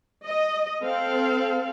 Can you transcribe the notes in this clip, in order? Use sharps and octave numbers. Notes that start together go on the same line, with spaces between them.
D#5
C4 A4 F5